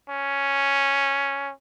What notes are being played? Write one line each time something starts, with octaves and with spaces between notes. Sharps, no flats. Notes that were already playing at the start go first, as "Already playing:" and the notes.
C#4